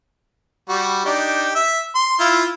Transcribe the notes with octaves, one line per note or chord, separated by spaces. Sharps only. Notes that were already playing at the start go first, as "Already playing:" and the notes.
G3 F#4
D4 D#4 G4
E5
C6
E4 F4